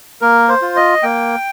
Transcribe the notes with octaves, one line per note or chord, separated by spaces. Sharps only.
A#3 A#4
C5
F4
D#5
A#3 G5